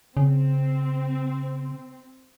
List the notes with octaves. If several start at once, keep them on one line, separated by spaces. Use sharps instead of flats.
C#3 C4